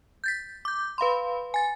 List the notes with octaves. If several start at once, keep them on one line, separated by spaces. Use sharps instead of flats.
G6 A6 B6
D6 G6
B4 F5 B5 C6
G#5 A6